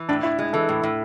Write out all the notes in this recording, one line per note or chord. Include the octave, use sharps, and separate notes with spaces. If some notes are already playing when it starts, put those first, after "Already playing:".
Already playing: E3
A2 D4
A2 E4
G#3 E4
E3 A4
A2
A2